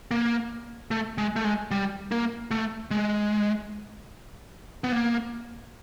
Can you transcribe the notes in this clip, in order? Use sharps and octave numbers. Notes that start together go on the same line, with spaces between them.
A#3
A3
G#3
A3
G#3
G3
A#3
A3
G#3
B3
A#3